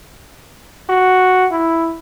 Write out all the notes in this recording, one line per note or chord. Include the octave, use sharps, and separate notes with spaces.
F#4
E4